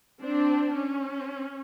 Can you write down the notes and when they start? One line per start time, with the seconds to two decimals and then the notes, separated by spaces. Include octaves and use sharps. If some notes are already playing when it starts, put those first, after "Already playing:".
0.21 C4 D4
0.76 C#4